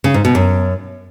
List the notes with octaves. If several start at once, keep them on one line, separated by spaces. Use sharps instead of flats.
C#3
G#2
B2
F#2